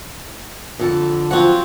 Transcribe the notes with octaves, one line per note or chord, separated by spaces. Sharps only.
F2 D3 A4
F3 F#3 C4 F4 F#4 F#5